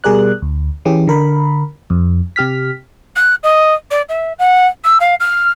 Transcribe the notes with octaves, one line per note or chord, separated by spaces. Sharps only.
B2 G3 G#4 A#4 D5 F#6
D2
E3 C#4 G4 G#4
D3 A#4 B5
F2
C3 G4 F6 B6
F#6
D#5
D5
E5
F#5
E6
F5
F6